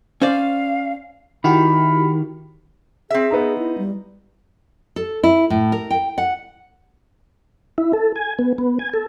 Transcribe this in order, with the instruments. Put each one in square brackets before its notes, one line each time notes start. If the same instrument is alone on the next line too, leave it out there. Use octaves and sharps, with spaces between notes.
[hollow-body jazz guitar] C#4 C5 D5 [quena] F5
[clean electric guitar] D#3 [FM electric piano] E4 F#4 G4 [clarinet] B5
[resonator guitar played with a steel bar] C4 E5 [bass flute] G#4
[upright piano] B3 D#4 A#5
[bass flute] E4
G3
[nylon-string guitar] A4
E4
A2
A#4
G5
F#5
[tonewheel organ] E4
A4
G#5
B3
B3
G#5
A4